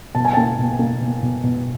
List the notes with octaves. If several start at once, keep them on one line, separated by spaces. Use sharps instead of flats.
B2 A5
G#5
A#3 G5 A5
B2
A#3
B2
B2
B2